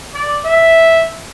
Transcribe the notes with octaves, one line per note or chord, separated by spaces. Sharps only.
D5
E5